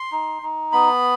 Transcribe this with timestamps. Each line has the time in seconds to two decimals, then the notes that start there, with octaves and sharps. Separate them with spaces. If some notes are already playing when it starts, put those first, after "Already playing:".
Already playing: C6
0.12 D#4
0.42 D#4
0.72 B3 B5